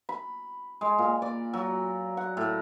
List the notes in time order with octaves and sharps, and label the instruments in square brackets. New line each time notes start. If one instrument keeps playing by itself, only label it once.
[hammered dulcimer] B5
G#3
A#2
D5
F#3
F#5
A2